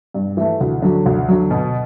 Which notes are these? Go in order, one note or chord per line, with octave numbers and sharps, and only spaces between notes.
G2
E3 A3
D2
D3 F#3
D2
D3 F#3
B2